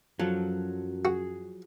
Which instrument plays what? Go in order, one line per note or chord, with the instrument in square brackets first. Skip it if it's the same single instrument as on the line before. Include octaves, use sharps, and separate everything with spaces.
[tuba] F#2 [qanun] F3 A4 [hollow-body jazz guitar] F#3
[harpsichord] F#4 [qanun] G#4